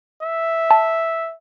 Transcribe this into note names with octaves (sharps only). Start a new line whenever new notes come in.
E5
A5